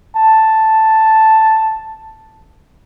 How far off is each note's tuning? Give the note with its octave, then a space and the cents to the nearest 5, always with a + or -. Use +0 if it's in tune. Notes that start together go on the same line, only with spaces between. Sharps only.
A5 +0